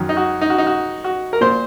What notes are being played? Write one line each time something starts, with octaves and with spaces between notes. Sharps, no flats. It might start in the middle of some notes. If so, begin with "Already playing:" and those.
Already playing: F#2 D#3
D#4
F#4
D#4
F#4
D#4
F#4
F#4
A#4
A#2 C5